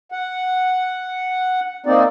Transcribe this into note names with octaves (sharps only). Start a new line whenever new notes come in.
F#5
A#3 C4 D#4 D5